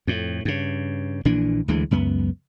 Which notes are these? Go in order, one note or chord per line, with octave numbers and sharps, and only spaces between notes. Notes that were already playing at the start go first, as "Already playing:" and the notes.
F2 A2
G2 C#3
A#1 A#2 E3 D4
D2 D3 E3 G#3
C#2 F#2 B3